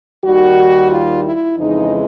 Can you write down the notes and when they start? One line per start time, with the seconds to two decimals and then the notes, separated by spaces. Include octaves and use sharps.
0.23 D#2 D#3 G3 F#4
0.91 F4
1.24 E4
1.58 F2 C#3 E3 G#3 D#4